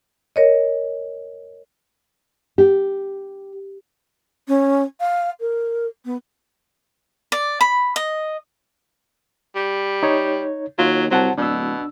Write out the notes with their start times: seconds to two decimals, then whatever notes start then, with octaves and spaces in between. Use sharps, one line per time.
0.36 A#4 C#5 D#5
2.58 G4
4.47 C#4
5.00 F5
5.41 A#4
6.05 B3
7.32 D5
7.61 B5
7.96 D#5
9.56 G3
10.03 D#4 C#5
10.79 D#2 F#3 F4
11.11 C2 F#3 C5 F#5 A5
11.38 D1 B2 D4 E6